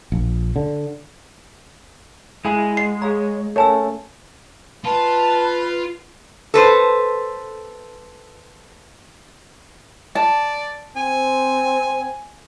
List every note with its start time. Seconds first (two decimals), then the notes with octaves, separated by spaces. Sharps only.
0.12 A#1
0.56 D3
2.45 G#3 E4 G#4 F5 G#5
2.77 D#5 F#5 C7
3.02 G#4 C#5 F5 A#5
3.56 A3 C#4 A#4 C#5 G#5 A5 E6
4.85 F4 B4 A5 B5
6.54 A4 B4 C5
10.15 D5 A5
10.96 C4 G#5